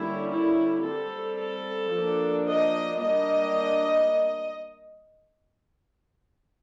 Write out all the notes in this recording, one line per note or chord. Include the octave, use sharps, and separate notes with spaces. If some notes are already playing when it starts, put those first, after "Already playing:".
Already playing: D3 G3 A#3 C#4 E4
E4
G3 C4 A4
A4
F3 A#3 D4
D#5
G3 A#3 D4 D#5